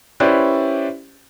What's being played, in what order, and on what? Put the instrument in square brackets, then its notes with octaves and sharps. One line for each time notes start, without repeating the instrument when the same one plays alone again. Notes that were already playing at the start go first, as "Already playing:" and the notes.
[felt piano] C#4 E4 G4 B4 C5 D5